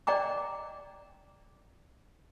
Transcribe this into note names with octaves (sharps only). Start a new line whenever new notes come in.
D5 D#5 G5 A#5 D6